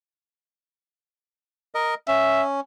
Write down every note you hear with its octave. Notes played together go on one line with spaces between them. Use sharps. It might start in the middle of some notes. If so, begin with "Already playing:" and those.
A#4 D#5
C#4 E5